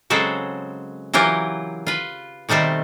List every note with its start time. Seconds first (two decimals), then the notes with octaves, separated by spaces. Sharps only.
0.10 C#3 F#3 G#3 C4 A4
1.14 E3 F#3 F4 G4 A#4
1.87 F4 B4
2.49 B2 D#3 G3 A3 C4